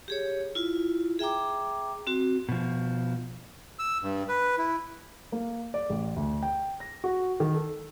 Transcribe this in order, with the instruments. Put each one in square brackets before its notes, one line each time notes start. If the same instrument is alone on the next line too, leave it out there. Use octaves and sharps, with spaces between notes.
[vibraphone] G4 G#4 C#5
E4 F4
G#4 E5 G5 A#5 D6
C4 F#4
[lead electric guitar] B2 F3
[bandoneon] E6
G2
B4
E4
[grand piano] A#3
D5
A1
D2
G5
A#6
F#4
D#3
A4